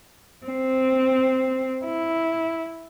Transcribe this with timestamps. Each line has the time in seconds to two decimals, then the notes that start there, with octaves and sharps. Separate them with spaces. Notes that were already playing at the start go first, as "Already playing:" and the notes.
0.46 C4
1.85 E4